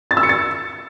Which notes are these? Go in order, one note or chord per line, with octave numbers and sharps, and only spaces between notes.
A6
E6
C#7
A6